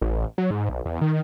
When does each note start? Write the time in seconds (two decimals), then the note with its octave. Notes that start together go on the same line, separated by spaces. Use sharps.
0.01 A1
0.38 F#3
0.51 G#2
0.69 B1
0.86 E2
1.01 D#3